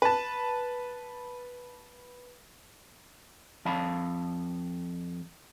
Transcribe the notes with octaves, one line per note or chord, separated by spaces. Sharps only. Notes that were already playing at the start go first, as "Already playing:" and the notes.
B4 A5
F2 F5 A5 B5